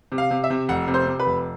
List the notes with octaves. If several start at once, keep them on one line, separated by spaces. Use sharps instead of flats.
C3
F5
C3
E5
C3
F1 F#5
C3
C5
C3
B4
F1